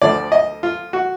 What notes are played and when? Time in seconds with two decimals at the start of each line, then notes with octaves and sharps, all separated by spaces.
0.02 D2 D3 F3 D5
0.32 D#5
0.63 F4
0.93 F#4